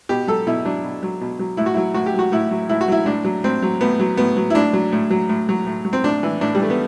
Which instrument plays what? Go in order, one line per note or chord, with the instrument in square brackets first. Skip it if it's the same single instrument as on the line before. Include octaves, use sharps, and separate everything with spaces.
[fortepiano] B2 G4
F#3 A4
B2 E4
F#3 D4
B2
F#3
B2
F#3
A2 E4
F#4
F#3 E4
A2 F#4
G4
F#3 F#4
A2 E4
F#3
A2 E4
F#4
F#3 E4
A2 D4
F#3
A2 C4
F#3
A2 B3
F#3
A2 B3
F#3
E4
A2 D4
F#3
A2
F#3
A2
F#3
A2
F#3
C4
A2 D4
E3
A2 D4
G3
E3 A3
B3